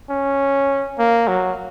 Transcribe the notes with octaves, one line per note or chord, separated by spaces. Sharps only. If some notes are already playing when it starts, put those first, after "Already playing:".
C#4
A#3
F#3